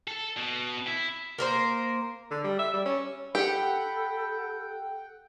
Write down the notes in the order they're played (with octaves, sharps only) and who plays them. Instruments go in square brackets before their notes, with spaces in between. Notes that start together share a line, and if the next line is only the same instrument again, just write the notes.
[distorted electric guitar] A4
B2
E4
[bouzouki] A#3 A#4 C5
[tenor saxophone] D3
G3
E5
G3
C#4
[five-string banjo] G4 [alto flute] A4 [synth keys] F#5 G5 [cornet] B5